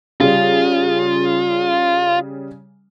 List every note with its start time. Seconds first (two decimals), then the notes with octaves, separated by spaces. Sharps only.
0.21 C#3 G3 F4